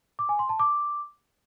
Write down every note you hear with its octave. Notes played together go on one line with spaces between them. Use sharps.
D6
G#5
C6
A5
D6